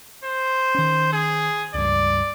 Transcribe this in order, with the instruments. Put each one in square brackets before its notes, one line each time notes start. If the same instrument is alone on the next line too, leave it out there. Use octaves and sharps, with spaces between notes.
[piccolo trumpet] C5
[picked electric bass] D#3 C#4
[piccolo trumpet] G#4
[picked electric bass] C#2 G2 [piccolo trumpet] D5